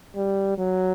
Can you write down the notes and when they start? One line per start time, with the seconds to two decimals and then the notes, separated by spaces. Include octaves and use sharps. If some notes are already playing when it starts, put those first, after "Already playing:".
0.16 G3
0.58 F#3